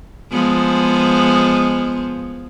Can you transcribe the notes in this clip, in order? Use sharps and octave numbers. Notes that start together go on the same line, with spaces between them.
F3 G#3 B3